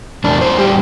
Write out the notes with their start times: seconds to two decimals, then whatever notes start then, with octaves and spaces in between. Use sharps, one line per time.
0.24 E2 D4
0.41 C5
0.58 G3 G4